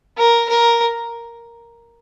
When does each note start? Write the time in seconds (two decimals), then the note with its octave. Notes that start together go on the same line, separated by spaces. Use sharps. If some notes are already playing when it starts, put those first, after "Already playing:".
0.18 A#4
0.49 A#4